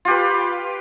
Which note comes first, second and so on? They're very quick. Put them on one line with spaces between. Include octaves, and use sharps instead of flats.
F4 G4 B4